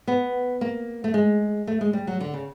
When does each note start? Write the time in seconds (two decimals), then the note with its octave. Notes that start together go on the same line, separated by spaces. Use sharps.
0.07 B3
0.61 A#3
1.04 A3
1.14 G#3
1.67 A3
1.81 G#3
1.93 G3
2.07 F#3
2.21 D3
2.34 C#3